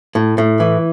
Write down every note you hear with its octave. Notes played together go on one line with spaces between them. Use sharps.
A2
A2
E3